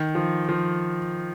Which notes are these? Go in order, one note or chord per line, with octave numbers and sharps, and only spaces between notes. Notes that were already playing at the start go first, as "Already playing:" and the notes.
Already playing: D#3
F3
F3